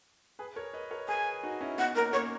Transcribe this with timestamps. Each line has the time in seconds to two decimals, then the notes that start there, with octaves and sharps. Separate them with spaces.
0.39 G#4 B4
0.56 A#4 C#5
0.73 B4 D#5
0.91 A#4 C#5
1.08 G#4 B4 G#5
1.43 D#4 F#4
1.61 C#4 E4
1.78 B3 D#4 F#5
1.95 A#3 C#4 A#4
2.13 A#3 C#5